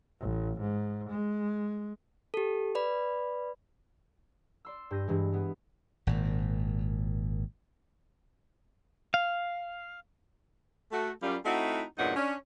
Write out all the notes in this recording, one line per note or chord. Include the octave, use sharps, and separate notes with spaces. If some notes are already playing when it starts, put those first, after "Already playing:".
A1
G#2
G#3
G4 A4
B4 D5 B5
D5 C6 E6
G2 G6 A#6 D#7
G2 E3 G#3
G#3 B3
G#1 A#2
F5
A3 F#4
F#2 G3 F4
A3 C4 D#4 E4 F#4
E2 G2 A#2 D#4 C#5 F#5
C#4 D4